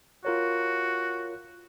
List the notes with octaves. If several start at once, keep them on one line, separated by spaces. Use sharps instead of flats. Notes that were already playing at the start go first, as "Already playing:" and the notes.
F4 F#4 A#4 C#5